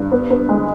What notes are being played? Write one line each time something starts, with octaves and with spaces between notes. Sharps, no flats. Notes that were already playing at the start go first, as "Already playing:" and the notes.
Already playing: G2
B3
B3
G#3